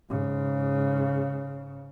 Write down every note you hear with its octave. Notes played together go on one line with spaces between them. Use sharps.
G#2 C#3